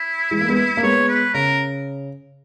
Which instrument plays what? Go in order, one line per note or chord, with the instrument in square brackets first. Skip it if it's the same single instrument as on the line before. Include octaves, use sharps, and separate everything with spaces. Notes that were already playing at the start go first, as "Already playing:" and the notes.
Already playing: [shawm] E4
[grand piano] E3 G#3
A#3
G#3 B3
A#3
[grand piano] G#3 B3 [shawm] C#5
[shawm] B4
[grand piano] C#3 [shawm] A#4